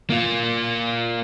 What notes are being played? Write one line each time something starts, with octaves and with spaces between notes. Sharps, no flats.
A#3 F4